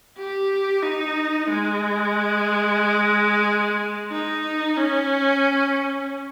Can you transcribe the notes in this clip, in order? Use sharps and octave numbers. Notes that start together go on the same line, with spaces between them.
G4
D#4
G#3
D#4
C#4